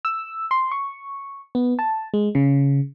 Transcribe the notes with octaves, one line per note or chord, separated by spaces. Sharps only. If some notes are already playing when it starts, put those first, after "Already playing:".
E6
C6
C#6
B3
A5
G#3
C#3